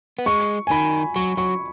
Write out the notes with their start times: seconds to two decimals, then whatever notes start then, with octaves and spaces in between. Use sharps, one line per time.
0.19 B3
0.26 G#3 C#6
0.67 G#5
0.71 D#3 B5
1.16 F#3 C#6
1.37 F#3 C#6